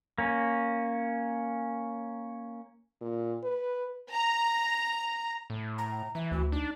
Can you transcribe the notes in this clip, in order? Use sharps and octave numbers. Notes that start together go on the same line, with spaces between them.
A#3 C#4
A#2
B4
A#5
A2
A#5
E3 E5
D2 F#4
D4 D#4